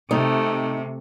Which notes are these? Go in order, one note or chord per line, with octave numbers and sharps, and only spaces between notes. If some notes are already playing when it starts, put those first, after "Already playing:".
C3 A3 D#4